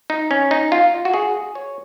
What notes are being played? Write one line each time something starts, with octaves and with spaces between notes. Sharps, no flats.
D#4
C#4
D#4
F4
F#4
G#4
C#5